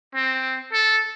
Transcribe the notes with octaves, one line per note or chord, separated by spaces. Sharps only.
C4
A4